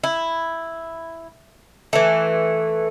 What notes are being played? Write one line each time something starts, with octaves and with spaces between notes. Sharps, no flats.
E4
E3 A3